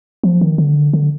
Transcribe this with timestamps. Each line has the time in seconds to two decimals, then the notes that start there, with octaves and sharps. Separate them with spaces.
0.24 F3
0.41 D#3
0.58 D3
0.93 D3